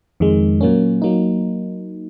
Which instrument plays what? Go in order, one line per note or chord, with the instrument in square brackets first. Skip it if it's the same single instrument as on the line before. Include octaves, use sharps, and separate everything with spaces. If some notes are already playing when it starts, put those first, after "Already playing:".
[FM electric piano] F2 D#3 G#3
A#2 F#3 A#3 C#4
F#3 A#3 D#4